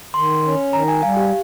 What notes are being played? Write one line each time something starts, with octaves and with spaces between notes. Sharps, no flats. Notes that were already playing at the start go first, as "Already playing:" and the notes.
D#3 C6
C#4
D#3 A#5
G#5
G3 F5
G4